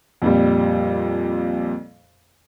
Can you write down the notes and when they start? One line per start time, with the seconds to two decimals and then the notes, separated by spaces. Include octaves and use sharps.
0.22 F2 A#2 G3